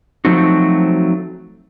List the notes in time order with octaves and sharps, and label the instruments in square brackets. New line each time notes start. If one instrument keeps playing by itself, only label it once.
[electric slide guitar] F3 F#3 A3 C4 D#4 F#4